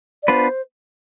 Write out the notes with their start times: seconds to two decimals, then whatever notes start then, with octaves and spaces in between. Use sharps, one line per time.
0.23 D5
0.28 B3 D4 F4 B4 C5